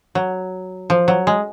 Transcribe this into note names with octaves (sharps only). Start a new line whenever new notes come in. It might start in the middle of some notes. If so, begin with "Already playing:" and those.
F#3
F3
F#3
G#3